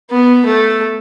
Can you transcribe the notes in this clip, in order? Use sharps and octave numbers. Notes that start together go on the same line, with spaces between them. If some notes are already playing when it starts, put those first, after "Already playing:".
B3
A3